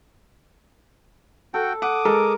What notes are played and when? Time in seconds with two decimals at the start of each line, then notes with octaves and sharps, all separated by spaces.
1.54 F#4 A4 G5
1.82 F#5 D6 D#6
2.05 G#3 A4 A#4